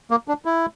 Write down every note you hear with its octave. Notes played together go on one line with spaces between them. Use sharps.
A#3
D4
E4